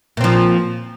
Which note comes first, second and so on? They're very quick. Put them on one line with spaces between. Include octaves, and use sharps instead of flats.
A#2 C4 F3